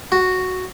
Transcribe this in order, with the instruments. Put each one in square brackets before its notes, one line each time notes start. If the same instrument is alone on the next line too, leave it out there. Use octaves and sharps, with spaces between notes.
[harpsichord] F#4